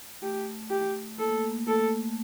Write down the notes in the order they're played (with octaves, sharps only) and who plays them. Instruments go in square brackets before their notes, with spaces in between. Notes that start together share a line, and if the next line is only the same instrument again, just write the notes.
[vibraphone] A3 [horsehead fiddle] G4
[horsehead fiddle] G4
[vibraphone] A#3 [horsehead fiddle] A4
[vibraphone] A3
A#3
A#3
[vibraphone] A3 [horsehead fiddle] A4